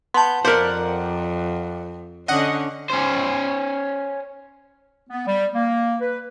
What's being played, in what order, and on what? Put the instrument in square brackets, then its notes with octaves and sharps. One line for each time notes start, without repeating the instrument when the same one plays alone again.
[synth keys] B3 G6 [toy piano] A5 C6
[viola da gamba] F2 [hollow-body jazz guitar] A#4 C5 [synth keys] D5 F#5 [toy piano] F5
[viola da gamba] D3 C#4 [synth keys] D#5 F#5
[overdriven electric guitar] C#4 C5
[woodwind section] B3
G3
A#3
B4